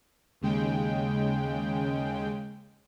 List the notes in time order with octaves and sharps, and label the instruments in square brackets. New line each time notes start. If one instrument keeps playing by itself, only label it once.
[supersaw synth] D#2 C#3 G#3 G5